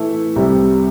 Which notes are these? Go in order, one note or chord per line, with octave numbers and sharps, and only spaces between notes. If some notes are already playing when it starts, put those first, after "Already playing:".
Already playing: E3 A3 E4
C2 C3 G3